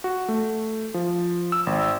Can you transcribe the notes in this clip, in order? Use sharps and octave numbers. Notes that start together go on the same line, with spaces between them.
F#4
A3
F3
E6
G#1